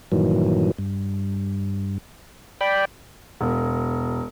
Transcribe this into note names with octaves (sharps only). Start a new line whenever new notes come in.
G2 A#2 D#3 E3 F#3
G2
D5 G5 B5
E1